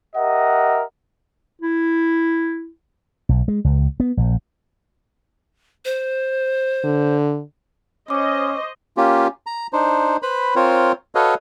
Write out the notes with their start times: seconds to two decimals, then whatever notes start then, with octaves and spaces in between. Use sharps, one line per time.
0.16 G4 A#4 D#5 E5 F#5
1.61 E4
3.29 B1
3.48 G#3
3.65 C#2
4.00 B3
4.17 A#1
5.85 C5
6.84 D3
8.10 C#4 C5 D#5 C#6 D6
8.97 A#3 C#4 F4 G4
9.47 A#5
9.73 D4 D#4 C5
10.22 B4 C5 B5
10.56 C4 F4 A#4 C5 C#5
11.15 F#4 A4 B4 C#5 D#5 F5